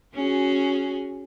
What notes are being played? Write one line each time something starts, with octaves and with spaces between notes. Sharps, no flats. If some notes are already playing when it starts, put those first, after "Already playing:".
C#4 F#4 G#4